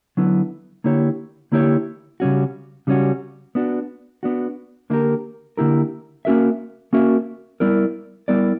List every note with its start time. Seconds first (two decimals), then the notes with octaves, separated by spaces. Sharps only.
0.17 D3 F#3 B3 E4
0.84 D3 A#3 E4 G4 C#5
1.52 D3 A#3 E4 G4 C#5
2.20 C#3 G3 C#4 F#4
2.87 C#3 G3 C#4 F#4
3.55 B3 D4 F#4
4.23 B3 D4 F#4
4.90 D3 A#3 E4 G4 A#4
5.57 D3 A#3 E4 G4 A#4
6.25 A#3 C#4 F#4 A#4 E5
6.93 A#3 C#4 F#4 A#4 E5
7.60 G3 B3 E4 A#4 D5
8.28 G3 B3 E4 A#4 D5